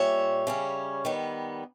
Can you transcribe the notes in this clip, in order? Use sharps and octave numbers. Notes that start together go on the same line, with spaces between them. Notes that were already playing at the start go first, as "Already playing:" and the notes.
Already playing: A#2 G3 C#4 C#5 E5
C#3 G3 C#4
D#3 G3 B3